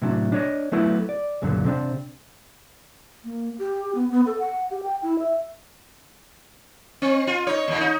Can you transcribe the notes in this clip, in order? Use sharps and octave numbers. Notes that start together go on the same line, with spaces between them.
A2 C3 F#3 D4
D4 C#5 D#5
F#3 A3 B3 E4
D5
C#2 F#2 A#2 D3 F#3
C3 C4 D4
A#3
G4
B3
B3
A4
F#5
G4
G5
E4
E5
C4
F4
D#4 C#5
D#2 A#2
D#4